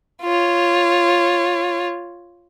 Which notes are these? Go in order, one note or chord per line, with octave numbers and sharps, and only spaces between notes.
F4 C#5